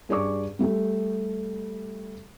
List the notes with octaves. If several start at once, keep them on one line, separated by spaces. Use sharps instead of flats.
G2 G#4 D5 C#6 D6
G3 A3 G4